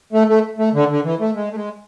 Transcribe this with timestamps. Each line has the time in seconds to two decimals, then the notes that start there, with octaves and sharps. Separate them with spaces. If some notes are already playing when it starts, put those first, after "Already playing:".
0.13 A3
0.28 A3
0.59 A3
0.74 D3
0.90 D3
1.04 E3
1.20 A3
1.35 G#3
1.51 A3
1.55 G#3